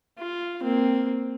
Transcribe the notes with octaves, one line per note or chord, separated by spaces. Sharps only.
F4
A#3 C4